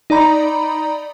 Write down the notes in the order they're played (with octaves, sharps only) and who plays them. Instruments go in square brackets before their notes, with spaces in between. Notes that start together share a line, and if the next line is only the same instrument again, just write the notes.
[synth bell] D#4 D5 A#5 B5